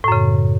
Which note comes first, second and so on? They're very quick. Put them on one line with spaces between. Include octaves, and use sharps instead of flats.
A2 F#2 C#3